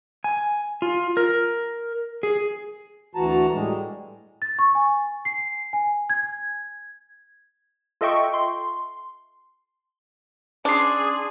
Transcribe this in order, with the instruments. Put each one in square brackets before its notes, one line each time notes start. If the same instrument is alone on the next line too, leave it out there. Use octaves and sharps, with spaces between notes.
[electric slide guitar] G#5
F4
A#4
G#4
[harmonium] D2 E3 F#4 A5 A#5
A2 G3 G#3
[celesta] A6
C#6
G#5
C7
G#5
G#6
[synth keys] F4 A4 D#5 E5 G5 C#6
C6
[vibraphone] C#4 C6 [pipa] D4 [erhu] G#4 [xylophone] D6 C7